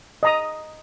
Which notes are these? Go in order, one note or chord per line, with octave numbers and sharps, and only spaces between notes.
D#5 A#5 D#6